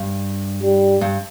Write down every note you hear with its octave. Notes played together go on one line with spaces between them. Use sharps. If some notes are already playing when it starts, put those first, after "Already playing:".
Already playing: G2
G3
G2